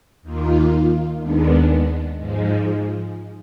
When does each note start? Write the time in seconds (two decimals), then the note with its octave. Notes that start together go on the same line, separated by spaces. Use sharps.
0.22 D#2 D#3 A#3 F4
1.20 D#2 D#3 G#3 B3 D4
2.18 G#2 F3 G#3